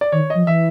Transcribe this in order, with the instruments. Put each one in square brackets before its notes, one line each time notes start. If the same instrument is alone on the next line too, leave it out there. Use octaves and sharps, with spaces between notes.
[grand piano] D5
[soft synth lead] D#3 [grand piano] C#5
[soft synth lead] F3 [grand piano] D#5
[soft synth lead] E3 [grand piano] E5